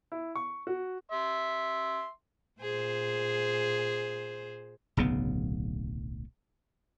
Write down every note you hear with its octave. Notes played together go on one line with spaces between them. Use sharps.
E4
C#6
F#4
E5 C6
A#2 G#4 C5
D1 B1 C#3 B3